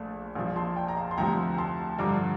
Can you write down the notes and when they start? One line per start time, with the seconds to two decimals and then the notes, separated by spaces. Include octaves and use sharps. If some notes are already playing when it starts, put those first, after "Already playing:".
Already playing: A#1 A#2 A3 A5
0.35 A#1 A#2 F3 F5
0.56 A5 C6
0.76 G5
0.88 A#5
0.96 F5 A5
1.11 C6
1.17 D2 C3 F3 G5 A#5
1.58 A5 C6
1.99 G2 D3 F3 A#5 D6